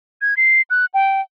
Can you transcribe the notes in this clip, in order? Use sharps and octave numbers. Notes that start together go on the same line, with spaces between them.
G#6
C7
F#6
G5